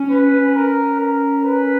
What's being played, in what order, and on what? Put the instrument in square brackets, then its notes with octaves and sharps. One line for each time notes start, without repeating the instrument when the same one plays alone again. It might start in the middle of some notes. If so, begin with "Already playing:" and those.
Already playing: [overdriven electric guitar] C#4
[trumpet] B4
A#4
A#4
B4